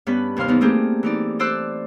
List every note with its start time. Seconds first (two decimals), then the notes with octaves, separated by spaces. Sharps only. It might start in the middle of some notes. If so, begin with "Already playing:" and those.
0.07 G2 B3 C#4 B4 B5
0.36 D#2 C3 F5 C6 F6
0.48 E3 B3 D#4
0.61 A3 A#3 C4 G4 G#4
1.03 E3 D#4 D5
1.39 A4 C5 D5 C6 E6 F#6